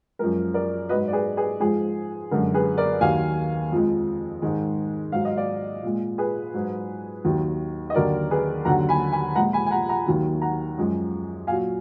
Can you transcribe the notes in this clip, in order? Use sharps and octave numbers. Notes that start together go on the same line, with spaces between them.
F#2 F3 G#3 A#4
A#4 D5
G#2 F#3 B4 D#5
D5
G#4 B4
G#4 B4
G#2 F3 G#3 G#4
F#2 D3 G#3 A#4
G#4 B4
A#4 D5
D#2 D#3 F#3 F5 G#5
F2 F3 G#3
G#2 D#3 G#3
G#2 F#3 F5
D#5
D5 F5
A#2 G#3
G#4 B4
G#2 F#3
D#2 D#3 F#3
D#5
D#2 D3 F#3 A#4 D5
G#4 B4
D#2 D3 F#3 F#5 A#5
G#5 B5
G#5 B5
A#2 F3 G#3 F#5 A#5
G#5 B5
G#5
F#5 A#5
F#5 A#5
D#2 D#3 F#3
F#5 A#5
F#2 F3 G#3
A#2 F#3 F5 G#5